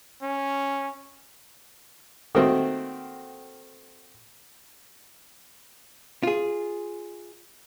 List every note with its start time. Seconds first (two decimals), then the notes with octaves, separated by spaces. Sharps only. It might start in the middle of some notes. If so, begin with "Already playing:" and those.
0.22 C#4
2.35 D#3 A3 A#3 C4 F#4
6.23 F4 G#4